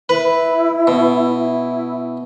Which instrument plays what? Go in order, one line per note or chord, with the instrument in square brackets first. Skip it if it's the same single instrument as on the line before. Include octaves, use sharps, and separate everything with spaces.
[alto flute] E4 [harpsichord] B4
[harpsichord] B2
[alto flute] E4